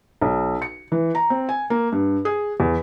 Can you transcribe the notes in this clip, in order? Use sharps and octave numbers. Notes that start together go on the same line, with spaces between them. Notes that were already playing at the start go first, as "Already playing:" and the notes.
B1
C#7
E3
A#5
C4
G#5
A#3
G2
G#4
E2